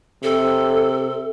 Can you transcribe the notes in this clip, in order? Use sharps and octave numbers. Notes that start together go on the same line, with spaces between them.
C3 A4